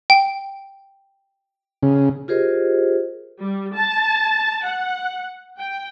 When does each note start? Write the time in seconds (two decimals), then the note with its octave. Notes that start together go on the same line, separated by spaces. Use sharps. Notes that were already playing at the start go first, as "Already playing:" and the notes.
0.10 G5
1.83 C#3
2.28 F4 G4 G#4 A#4 C5 D#5
3.41 G3
3.75 A5
4.65 F#5
5.58 G5